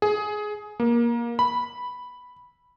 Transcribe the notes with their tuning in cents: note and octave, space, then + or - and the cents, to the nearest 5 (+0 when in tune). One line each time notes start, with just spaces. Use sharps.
G#4 +15
A#3 +20
B5 -5